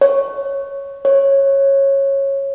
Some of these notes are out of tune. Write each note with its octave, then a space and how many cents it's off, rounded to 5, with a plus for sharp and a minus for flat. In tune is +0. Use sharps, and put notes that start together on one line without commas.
C#5 +0
C#5 -15